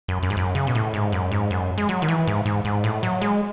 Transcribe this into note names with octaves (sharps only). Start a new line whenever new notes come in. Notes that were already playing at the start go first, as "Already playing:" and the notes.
F#2
F#2
G#2
F#2
C#3
B2
A2
G#2
F#2
G#2
F#2
G#3
F#3
D#3
E3
G#2
G#2
G#2
A2
F#3
G#3